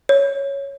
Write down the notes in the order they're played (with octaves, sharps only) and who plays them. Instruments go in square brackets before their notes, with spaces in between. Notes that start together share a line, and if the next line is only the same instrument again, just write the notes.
[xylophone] C#5